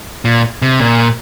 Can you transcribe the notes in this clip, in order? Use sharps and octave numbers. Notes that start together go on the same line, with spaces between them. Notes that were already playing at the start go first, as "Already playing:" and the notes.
A#2
C3
A#2